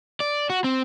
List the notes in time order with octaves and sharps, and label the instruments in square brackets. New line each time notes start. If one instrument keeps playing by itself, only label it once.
[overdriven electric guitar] D5
F#4
C4